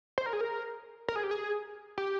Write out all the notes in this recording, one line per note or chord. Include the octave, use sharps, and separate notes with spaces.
C5
A#4
G#4
A#4
A#4
G#4
G4
G#4
G4